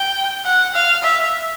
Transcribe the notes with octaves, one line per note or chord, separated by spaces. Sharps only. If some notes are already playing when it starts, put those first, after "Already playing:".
Already playing: G5
F#5
F5
E5